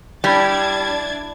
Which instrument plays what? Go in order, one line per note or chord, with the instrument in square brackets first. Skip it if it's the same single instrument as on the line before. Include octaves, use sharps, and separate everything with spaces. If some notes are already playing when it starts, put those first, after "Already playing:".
[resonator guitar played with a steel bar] G3 [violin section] D4 G#6 A6 [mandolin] E4